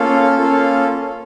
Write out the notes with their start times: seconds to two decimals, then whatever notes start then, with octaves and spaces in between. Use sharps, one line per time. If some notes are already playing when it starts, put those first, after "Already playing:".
Already playing: A#3 C#4 F4 A4 F5
0.38 A#3 C#4 F4 A4